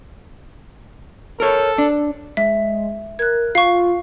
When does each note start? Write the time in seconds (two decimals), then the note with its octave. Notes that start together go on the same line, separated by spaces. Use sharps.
1.40 A4 A#4 C#5
1.78 D4
2.37 G#3 E5
3.19 A#4 F#6 G#6
3.55 F4 F5 C#6